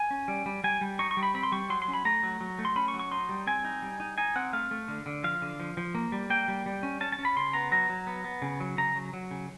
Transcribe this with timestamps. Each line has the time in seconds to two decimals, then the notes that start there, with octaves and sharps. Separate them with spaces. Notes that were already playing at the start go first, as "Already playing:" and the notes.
Already playing: G#5
0.11 C#4
0.28 G3
0.46 G3
0.64 G3 G#5
0.81 G3
0.99 D#4 C#6
1.11 C#6
1.17 G3
1.23 B5
1.34 C4 B5
1.43 C6
1.52 G3 C#6
1.70 F#3 C6
1.82 C6
1.88 C#4
1.94 B5
2.05 A3 A#5
2.23 F#3
2.40 F#3
2.59 A3
2.65 C6
2.76 C#4 B5
2.88 C#6
2.94 F#3
2.99 C#6
3.11 D#4 C6
3.29 G3
3.47 C4 G#5
3.65 D#4
3.82 G3
4.00 D#4
4.18 D#4 G#5
4.36 C4 F#5
4.53 A3 F5
4.71 A3
4.88 D3
5.06 D3
5.24 F3 F5
5.42 D3
5.60 F3
5.77 F3
5.95 A#3
6.12 G3
6.30 A#3 G5
6.48 G3
6.66 G3
6.83 C#4
7.01 C#4 A5
7.12 A5
7.19 C#4
7.25 B5
7.36 C#3 C6
7.53 B3 A#5
7.72 F#3 A#5
7.89 F#3
8.07 B3
8.24 B3
8.42 C#3
8.60 F#3
8.78 C#3 A#5
8.95 F#3
9.13 F#3
9.31 C#3